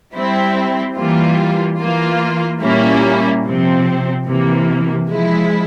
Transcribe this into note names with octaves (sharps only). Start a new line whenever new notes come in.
G3 C4 E4
E3 G3 A#3 F4
E3 A#3 F4
A#2 G3 A#3 C#4 E4
C3 F3 C4
C3 E3 A#3
F3 G#3 E4